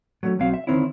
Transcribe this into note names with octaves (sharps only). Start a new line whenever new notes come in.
F#3 A3 C#4
B1 F#3 C4 F5
E5
D3 D#3 C4 C#4 E4